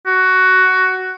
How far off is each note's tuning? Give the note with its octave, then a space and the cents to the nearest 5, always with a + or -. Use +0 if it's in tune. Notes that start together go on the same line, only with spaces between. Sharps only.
F#4 +10